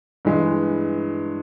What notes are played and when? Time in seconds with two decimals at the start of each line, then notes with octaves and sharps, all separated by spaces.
0.25 G2 E3 G#3